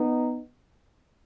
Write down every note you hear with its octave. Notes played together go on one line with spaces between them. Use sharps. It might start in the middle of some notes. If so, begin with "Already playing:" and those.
Already playing: B3 D#4